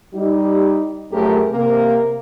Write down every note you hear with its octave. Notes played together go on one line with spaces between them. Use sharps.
G3 D#4 G4
F#2 F3 A3 G4 G#4 A#4
C3 A#3 A#4